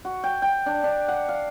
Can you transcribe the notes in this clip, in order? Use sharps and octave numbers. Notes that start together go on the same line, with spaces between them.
F#4
G5
G5
D4
D4
F#5
F5